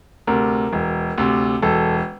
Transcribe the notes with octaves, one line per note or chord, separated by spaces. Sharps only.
D2 C3 A#4
E1
D2 C3
E1 A4